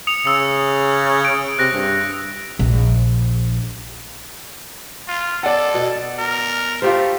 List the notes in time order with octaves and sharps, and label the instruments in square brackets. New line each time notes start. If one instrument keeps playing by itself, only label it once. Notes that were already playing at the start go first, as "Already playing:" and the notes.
[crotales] D#6 C#7 F7
[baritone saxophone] C#3 [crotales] E6 C#7
[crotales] D7
[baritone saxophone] C3 [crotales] F#6 A#6
[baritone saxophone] G2
[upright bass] A#1
[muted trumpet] F4
[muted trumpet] A4 [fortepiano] D5 F#5
[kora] B2
[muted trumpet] A#4
[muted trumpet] A3 [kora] F4 G4 C5